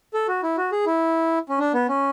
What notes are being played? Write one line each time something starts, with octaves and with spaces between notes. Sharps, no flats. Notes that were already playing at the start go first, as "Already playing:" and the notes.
A4
F#4
E4
F#4
G#4
E4
C#4
D4
B3
C#4